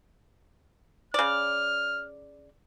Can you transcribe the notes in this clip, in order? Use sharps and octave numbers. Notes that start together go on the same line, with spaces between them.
C#3 D5 F6